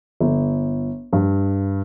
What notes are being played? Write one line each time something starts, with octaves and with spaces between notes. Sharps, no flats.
G1
G2